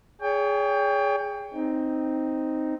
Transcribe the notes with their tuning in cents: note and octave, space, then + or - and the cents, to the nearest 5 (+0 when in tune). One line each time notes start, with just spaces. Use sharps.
G#4 +0 C#5 +35 G5 +20
C4 +0 D#4 +0